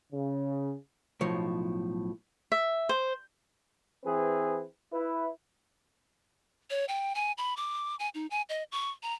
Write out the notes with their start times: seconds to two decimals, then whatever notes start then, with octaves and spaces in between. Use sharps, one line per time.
0.13 C#3
1.21 B1 A2 F3 C#5
2.52 E5
2.89 C5
4.05 E3 C4 G#4 B4
4.93 E4 B4
6.70 C#5
6.88 G5
7.15 G#5
7.38 B5
7.57 D6
7.99 G#5
8.14 D#4
8.31 G#5
8.49 D#5
8.72 C#6
9.03 A#5